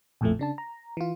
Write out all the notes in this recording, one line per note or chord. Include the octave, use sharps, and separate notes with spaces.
A#1 F2 A2 F3 A3
C#3 D4 A5
A#5
E3 F4